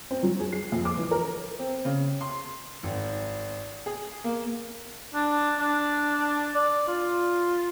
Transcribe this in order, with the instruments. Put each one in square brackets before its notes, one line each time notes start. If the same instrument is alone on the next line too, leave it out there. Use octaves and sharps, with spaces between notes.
[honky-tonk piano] C4
F#3
G#4
C7
F2
D6
E3
A#4
[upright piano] C4
C#3
C6
G#1
G#4
A#3
[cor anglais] D4
D4
D5
F4